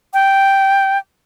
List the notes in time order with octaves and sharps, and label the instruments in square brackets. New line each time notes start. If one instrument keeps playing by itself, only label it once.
[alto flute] G5